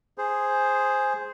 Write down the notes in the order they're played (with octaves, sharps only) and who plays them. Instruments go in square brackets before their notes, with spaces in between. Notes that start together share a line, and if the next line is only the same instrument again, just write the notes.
[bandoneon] G#4 C5